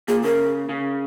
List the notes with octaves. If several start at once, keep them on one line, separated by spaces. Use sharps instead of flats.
A#2 G#4
C#3 A#4
C#3